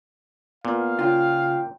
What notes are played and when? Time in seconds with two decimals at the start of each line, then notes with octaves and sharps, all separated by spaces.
0.65 A#2 B3 F5
0.99 C#3 F4 G5